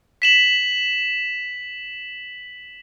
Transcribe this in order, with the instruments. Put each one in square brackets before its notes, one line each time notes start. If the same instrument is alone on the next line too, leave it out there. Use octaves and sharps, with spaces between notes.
[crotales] B6 E7 F#7